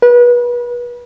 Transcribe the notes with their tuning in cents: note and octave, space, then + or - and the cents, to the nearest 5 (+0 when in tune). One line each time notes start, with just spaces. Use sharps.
B4 -30